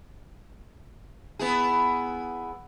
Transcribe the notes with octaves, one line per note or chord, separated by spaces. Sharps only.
B3 E4 G#4